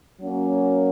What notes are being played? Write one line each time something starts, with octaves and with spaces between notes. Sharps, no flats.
F#3 A#3 C#4